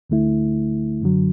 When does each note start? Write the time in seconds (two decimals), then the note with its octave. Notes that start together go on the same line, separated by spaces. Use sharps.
0.10 D2 D3 A3 E4
1.02 F#2 D3 F#3